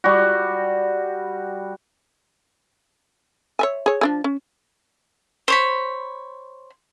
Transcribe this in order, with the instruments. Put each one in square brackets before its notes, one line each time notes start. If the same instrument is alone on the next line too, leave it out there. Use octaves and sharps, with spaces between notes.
[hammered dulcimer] G3 F#4
[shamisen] C#5 E5 G#5
G#4 C#5
F3 D4 G#4
C#4
[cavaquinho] C5 C#5 B5